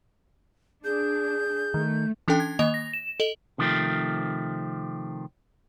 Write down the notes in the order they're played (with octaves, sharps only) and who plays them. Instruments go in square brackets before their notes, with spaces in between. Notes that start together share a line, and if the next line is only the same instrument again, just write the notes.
[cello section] D4 [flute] G#4 [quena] G6
[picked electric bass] D#3 [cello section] A3
[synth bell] E3 C#4 D4 A4 G5
G#6
D#3 A#3 D#5 F7
A#6
E7
A4 D#5 F#7
[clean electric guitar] C3 D#3 F3 A3 C4